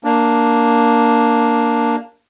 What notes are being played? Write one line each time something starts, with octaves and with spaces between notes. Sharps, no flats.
A#3 D4